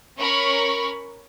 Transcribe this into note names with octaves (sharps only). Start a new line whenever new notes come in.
C#4 A#4 B5 C#6